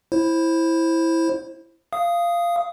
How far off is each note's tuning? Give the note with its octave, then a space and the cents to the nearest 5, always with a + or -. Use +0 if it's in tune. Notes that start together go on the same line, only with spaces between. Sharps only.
E4 +0 C5 +20
F5 -15 D#6 +0